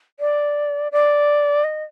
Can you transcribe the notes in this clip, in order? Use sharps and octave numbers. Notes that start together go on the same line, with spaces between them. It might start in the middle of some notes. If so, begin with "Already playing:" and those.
D5
D5
D#5